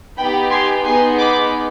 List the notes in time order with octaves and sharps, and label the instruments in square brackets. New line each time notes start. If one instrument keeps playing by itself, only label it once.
[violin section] B3 D#4 G4 G5 B5
G#5 C6
B3 D#4 G#4 G#5 C6
B5 D6